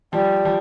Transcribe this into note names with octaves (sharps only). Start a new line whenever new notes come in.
F3 G3
F3